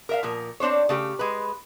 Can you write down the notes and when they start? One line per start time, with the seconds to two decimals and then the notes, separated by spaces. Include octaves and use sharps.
0.09 A#4 E5 F5
0.23 A#2 F3 A#4
0.60 C4 D4 C5 C#5
0.89 C#3 A3 G4
1.19 G#3 B4